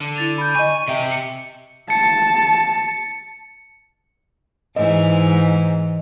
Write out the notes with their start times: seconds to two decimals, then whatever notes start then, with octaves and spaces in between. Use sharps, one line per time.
0.01 D3
0.16 E4 A6 F7
0.38 B5 G6
0.55 D#5 G#5 C#6
0.88 C3 E5 G5
1.11 C#7
1.90 A5 C#7
4.76 G#2 E3 D#5